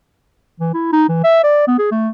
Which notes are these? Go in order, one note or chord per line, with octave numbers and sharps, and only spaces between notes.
E3
E4
D#4
E3
E5
D5
B3
G#4
A3